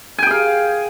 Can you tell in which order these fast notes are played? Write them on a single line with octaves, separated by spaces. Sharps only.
G#5 G5 G#4 F5